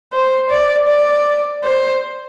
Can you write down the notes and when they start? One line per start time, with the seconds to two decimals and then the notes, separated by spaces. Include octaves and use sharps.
0.13 C5
0.50 D5
0.88 D5
1.64 C5